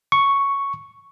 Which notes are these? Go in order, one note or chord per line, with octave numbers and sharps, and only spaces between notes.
C#6